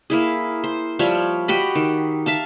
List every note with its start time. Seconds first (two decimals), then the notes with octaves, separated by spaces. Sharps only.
0.10 A#3 E4 G#4
0.64 C5
0.99 F3 G3 C#5 E5
1.48 F#4 G4 D#5 B5
1.75 D#3
2.26 E5 F5 A5